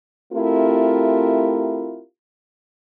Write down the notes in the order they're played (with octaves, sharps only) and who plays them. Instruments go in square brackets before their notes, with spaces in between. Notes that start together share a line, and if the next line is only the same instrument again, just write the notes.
[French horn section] A3 C4 E4 F4 G4 A#4